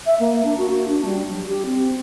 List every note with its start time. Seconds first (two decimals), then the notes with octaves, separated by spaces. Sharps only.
0.06 E5
0.20 A#3
0.45 D4
0.58 F#4
0.70 F#4
0.88 D4
1.05 G3
1.30 F#3
1.47 G4
1.66 C4